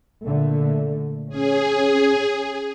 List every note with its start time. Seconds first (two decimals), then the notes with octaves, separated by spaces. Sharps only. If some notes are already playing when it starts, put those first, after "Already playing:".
0.25 A#2 D3 A3
1.29 C#4 G#4